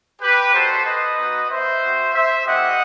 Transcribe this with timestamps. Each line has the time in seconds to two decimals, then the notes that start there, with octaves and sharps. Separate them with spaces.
0.21 G4 B4
0.54 G3 D#4 F#4 A4 C5
0.86 B4 D#5
1.18 B3 D#4 F#4
1.50 C5 E5
1.83 C4 F#4
2.14 C5 E5
2.46 A3 C4 E4 G4 D#5 F#5